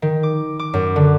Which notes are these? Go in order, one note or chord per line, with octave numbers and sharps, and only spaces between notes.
D#3
D6
D6
F#2
D3